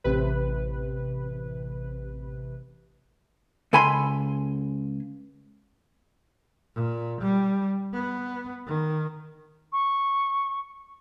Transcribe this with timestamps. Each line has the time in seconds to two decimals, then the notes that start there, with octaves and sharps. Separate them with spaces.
0.04 A1 C3 B4
3.73 C#2 A4 G#5 B5 C6
6.75 A#2
7.21 G3
7.94 B3
8.67 D#3
9.72 C#6